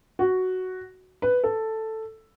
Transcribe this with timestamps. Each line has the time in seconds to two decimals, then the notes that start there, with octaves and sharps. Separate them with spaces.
0.19 F#4
1.22 B4
1.44 A4